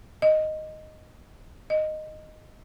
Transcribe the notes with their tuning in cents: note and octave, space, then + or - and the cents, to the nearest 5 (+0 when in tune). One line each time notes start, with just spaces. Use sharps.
D#5 +0
D#5 -5